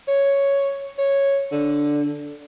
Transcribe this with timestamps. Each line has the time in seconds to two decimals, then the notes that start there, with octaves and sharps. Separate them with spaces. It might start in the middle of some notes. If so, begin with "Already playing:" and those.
0.08 C#5
0.99 C#5
1.52 D3